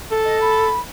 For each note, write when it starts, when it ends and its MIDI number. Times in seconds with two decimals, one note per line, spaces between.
0.11 0.73 69
0.25 0.40 75
0.41 0.78 83